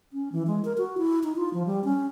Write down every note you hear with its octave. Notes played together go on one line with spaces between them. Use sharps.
C#4
E3
G#3
A#4
F#4
E4
D#4
F4
F3
G3
C#4